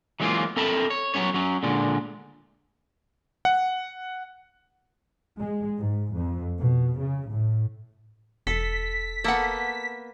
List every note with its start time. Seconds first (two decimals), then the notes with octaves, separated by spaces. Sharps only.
0.20 E3 F#3 G#3 A#3 C4 F4
0.57 C4 A4 A#4 E5 A5 B5
0.90 C#5
1.14 F#3 G#3 B3 C#4 C#5
1.34 F#3 C#4
1.63 A#2 D3 G#3
3.45 F#5
5.41 G#3
5.78 G#2
6.13 F2
6.59 B2
6.96 C#3
7.31 A2
8.47 E1 A4 B6
9.24 A#3 B3 A4 F#5